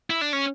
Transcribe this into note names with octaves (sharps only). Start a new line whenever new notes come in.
E4
D4
C#4